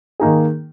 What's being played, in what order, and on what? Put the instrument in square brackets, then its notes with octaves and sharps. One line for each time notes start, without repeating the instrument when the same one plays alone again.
[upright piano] D#3 A#3 D#4 G#4